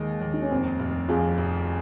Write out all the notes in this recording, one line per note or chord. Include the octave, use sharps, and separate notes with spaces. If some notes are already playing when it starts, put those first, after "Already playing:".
Already playing: D#2 D#3 G#3
D#2
D#4
C#4
F1 C4
F1
F2 F4 G#4
F1